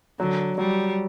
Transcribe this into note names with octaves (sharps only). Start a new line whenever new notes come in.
D3 F#3
F#3 G3